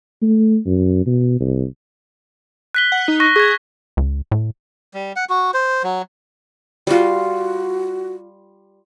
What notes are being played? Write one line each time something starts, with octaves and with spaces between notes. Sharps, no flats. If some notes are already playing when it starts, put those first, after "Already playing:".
A3
F#2
B2
C2
F#6 B6 G7
F#5
D#4
C#6 F#6 A#6
G#4 C#6 G#6
C#2
A2
G3
F#5
F#4
C5
F#3
G3 F4 F#4